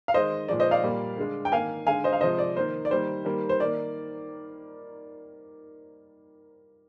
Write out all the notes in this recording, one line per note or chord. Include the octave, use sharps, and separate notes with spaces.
F5
D#3 G#3 C5 D#5
A#2 F3 G#3 D5
C5 D#5
D5 F5
A#2 G3 A#3
D3 G#3
G5
D#3 A#3 F5 G#5
D3 G#3 F5 G#5
C5 D#5
F5
C3 F3 G#3 C5 D#5
D5
D#3 A#3 C5
D5
D#3 G3 A#3 C5
D#3 G3 A#3
C5
D#3 A#3 D5